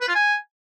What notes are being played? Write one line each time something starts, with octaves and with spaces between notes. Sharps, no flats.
B4
F4
G#5